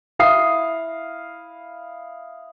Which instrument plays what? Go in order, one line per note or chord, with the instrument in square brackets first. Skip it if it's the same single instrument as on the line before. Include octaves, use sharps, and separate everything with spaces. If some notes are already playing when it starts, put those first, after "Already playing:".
[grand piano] E4 F5 D#6 C7